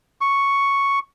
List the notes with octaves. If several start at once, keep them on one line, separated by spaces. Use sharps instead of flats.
C#6